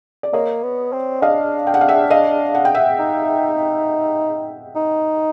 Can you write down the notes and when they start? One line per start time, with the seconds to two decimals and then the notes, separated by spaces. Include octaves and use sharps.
0.23 D5
0.33 A#3 C#5 D#5
0.63 B3
0.92 C4
1.22 D4 D#5 F5
1.67 G5
1.74 F#5
1.81 F5
1.89 E5 F#5
2.10 D#5 F5
2.55 F#5
2.65 G5
2.74 E5 F#5
2.99 D#4
4.76 D#4